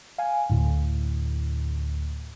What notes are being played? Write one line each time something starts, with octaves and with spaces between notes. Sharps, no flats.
F5 G#5
D2 A2 D3